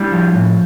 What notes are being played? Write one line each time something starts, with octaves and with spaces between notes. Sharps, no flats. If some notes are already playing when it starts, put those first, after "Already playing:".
Already playing: G3 D4 E4
F3
A2